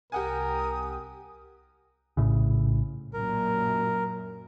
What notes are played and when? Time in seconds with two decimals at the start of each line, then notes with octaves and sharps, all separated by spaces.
0.12 C2 G4 A#4 F#5 G#5 D#6
2.17 A#1 A2 C#3
3.13 F#2 A#2 A#4